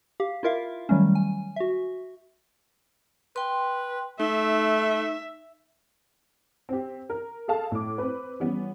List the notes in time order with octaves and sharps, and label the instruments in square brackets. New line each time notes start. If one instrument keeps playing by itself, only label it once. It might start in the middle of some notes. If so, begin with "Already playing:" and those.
[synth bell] G4 F5
E4 F4 A#4 E5 F5
D#3 F#3 G3 A3 C#4
G#5
F#4 E5
[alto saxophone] B4 [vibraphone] G5 C6
[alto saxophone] A3 [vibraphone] D#4 [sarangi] E5
[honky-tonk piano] C4 G4
A#4
G#4 A4 F5 A5
A2 D6
C4 B4
E3 G3 B3 C#4